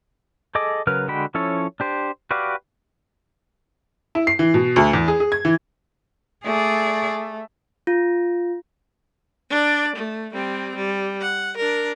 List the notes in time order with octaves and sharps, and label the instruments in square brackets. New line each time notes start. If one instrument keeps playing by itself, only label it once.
[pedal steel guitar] G#4 A4 D#5 D6
C#3 F#3 A#4 B4 F6
D3 G#3 F#4 G5 B5
F3 C#4 E4 A4 C#5
D4 G4 C5
F#4 G4 B4 D5 F5
[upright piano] E4
C7
E3
B2
D2
E2
G#4
G#4
G#6
E3
[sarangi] A3 [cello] G#4 D5
[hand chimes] F4
[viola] D4 D5
A3
G3 C4
G3
F#5
D4 A#4